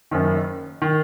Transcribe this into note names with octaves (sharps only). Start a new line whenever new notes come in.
F#1 F#2 D#3
D#3